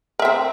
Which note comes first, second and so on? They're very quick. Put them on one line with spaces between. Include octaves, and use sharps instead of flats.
A#4 E5 C4